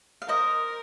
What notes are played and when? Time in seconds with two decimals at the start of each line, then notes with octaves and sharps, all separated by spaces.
0.22 F5
0.28 A#4 C5 D#5